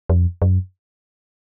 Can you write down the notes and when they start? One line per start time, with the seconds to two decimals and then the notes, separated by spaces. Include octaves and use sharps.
0.09 F2
0.42 F#2